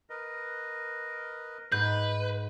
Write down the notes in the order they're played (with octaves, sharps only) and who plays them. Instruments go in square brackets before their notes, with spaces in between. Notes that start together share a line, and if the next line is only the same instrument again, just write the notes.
[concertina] A#4 B4 D#5
[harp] G#2 [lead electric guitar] B4 [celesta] G6